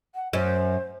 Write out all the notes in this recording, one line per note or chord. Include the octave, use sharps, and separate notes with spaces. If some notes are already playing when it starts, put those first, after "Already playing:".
F#5
F#2 C5